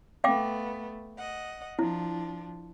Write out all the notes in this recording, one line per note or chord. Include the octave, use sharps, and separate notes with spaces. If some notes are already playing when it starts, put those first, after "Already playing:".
A3 B3 F5 G5 D6
D#5 F#5
F3 D4 E4